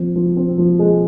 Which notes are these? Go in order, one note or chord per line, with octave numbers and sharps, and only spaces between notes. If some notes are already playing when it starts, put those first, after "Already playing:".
Already playing: F3 C4
F3
C4
F3
G#3